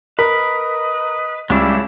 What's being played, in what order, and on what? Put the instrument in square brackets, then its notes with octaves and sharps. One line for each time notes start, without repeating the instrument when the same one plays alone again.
[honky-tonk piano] A#4 [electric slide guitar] B4 [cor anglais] D#5
[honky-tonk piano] C#2 [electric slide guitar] F#3 D4 E4 [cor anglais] G3